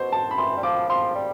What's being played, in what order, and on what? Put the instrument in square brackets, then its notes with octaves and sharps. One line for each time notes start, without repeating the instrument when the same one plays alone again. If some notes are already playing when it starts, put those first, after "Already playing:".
Already playing: [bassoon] B2 [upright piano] C5
[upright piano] A5
B5
[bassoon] E3 [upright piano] C6
[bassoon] G3
[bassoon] F3 [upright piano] D6
[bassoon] F3 [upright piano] C6
[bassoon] G3